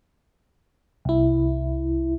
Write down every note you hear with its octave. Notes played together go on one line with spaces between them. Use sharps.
C2 E4